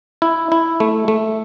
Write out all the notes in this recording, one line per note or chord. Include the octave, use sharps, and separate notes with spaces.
E4
E4
A3
A3